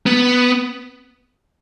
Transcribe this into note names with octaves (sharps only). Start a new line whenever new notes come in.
B3